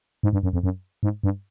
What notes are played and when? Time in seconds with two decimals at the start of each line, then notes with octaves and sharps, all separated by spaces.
0.23 G#2
0.33 G2
0.43 F#2
0.53 F2
0.63 F#2
1.03 G#2
1.23 G2